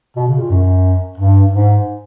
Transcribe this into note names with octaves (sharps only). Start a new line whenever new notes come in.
B2
C#3
A#2
F#2
G2
G#2